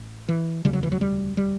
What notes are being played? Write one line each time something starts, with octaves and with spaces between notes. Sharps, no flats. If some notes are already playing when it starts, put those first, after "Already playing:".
Already playing: A1
E3
E1 D2 C#3 G3
F#3
E3
F#3
G3
G3